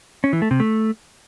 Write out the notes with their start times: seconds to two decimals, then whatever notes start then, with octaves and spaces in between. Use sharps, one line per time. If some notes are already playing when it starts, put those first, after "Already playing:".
0.24 C#4
0.33 E3
0.42 A3
0.51 C3
0.60 A3